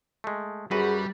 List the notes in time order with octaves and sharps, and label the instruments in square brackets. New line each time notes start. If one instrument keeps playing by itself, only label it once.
[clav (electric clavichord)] G#3 A3
[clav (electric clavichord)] F#2 F#4 B4 [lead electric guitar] G3 [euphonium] G#4